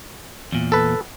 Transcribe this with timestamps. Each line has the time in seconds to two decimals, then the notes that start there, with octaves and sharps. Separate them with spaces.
0.52 E2 A#2
0.72 A4 B4